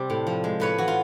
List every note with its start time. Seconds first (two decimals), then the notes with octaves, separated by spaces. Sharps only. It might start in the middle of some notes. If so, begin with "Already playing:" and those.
Already playing: C3 G3 C5 D5
0.10 A2
0.27 F3
0.44 G#3
0.60 A2 B4 C#5
0.78 E3 F#4
0.88 F4